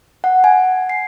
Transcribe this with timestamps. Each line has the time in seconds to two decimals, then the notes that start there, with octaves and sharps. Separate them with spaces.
0.24 F#5
0.44 G#5
0.89 C7